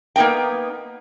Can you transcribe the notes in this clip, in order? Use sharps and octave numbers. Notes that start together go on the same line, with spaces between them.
A#3 B3 D#4 A#4 G5